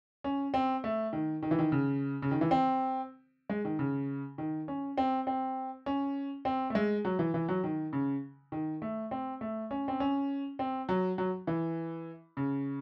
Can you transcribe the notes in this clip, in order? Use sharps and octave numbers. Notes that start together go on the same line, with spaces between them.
C#4
C4
A3
D#3
D#3
E3
D#3
C#3
C#3
D#3
E3
C4
G#3
D#3
C#3
D#3
C#4
C4
C4
C#4
C4
A3
G#3
F#3
E3
E3
F#3
D#3
C#3
D#3
A3
C4
A3
C#4
C4
C#4
C4
F#3
F#3
E3
C#3